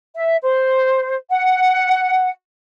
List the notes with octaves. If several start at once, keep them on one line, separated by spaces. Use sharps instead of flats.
E5
C5
F#5